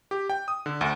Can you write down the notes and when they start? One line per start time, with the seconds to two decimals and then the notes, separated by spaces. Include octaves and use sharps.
0.11 G4
0.30 G5
0.48 D#6
0.66 D3
0.81 D2